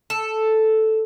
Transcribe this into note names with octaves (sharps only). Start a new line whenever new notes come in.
A4